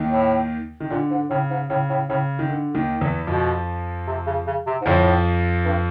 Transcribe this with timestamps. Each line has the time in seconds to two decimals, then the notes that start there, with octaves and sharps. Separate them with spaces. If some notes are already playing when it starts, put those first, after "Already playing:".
Already playing: D#2 D#3
0.12 A2
0.80 D#3
0.90 A#2 D3
1.11 G#2
1.30 A2 C#3
1.50 G#2
1.70 A2 C#3
1.90 A2
2.09 A2 C#3
2.39 D#3
2.49 D3
2.75 D#2 D#3
3.01 E2 E3
3.27 F2 B2 F3
4.07 C3
4.27 C#3
4.47 C#3
4.66 C3
4.81 G#2
4.86 F2 A2 F3
5.65 G2